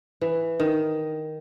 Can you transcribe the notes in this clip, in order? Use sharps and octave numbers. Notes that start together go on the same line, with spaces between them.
E3
D#3